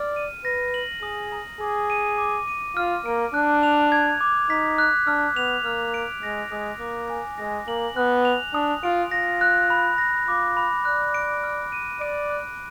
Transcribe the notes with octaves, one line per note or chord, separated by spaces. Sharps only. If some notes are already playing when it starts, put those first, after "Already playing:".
Already playing: D5 F6
D#7
B4 A#6
F#7
G#4 D#6
A#5
G#4 D6
D#7
D6
D#7
F4 F6
A#3 D7
D4 F#6
F7
G#6
D6
D#4 B6
F#6
D4 F6
B3 F7
A#3 F6
D7
G#3 A#6
G#3 D#6
A#3 D6
G#5
G#3 A#6
A#3 F#7
B3 F#6
F7
D4 D#6
F4 D7
F4 A#6
F#6
B5
A#6
F4 D6
B5
D5 F#6
D7
F6
D#7
D5 D7
F#6